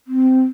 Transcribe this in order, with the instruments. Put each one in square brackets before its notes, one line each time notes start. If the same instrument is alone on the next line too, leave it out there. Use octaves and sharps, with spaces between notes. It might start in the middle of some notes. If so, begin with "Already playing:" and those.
[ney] C4